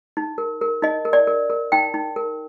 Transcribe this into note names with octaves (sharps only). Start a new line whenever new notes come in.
D#4
A#4
A#4
D#4 D#5
A#4
D5
A#4
A#4
D#4 G5
D#4
A#4